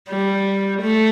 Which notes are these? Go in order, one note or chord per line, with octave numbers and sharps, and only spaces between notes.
G3
A3